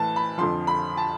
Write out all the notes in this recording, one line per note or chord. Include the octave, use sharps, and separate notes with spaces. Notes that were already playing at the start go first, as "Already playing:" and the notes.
Already playing: A2 E3 A5
B5
F2 D3 F3 C6
B5
A5